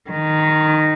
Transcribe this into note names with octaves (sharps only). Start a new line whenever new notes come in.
D#3